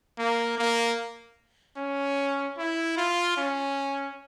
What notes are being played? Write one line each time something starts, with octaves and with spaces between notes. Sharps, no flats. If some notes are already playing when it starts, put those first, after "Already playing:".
A#3
A#3
C#4
E4
F4
C#4